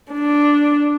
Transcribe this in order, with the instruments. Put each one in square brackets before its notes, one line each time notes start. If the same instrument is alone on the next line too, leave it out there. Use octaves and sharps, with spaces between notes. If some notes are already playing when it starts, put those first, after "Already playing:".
[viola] D4